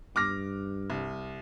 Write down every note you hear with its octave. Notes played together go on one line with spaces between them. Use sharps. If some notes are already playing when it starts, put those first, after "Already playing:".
G2 D6 F6 A#6
C2